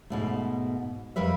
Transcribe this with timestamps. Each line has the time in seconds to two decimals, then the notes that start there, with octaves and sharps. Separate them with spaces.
0.10 G#2 B2 A3
1.16 F2 G3 A#4 B4 E5